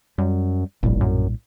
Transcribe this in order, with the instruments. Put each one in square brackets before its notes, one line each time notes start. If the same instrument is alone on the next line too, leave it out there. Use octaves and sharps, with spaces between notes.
[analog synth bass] F#2 [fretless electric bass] G3
[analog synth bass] F1 [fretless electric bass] A#1 A2 G3
[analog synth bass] F#2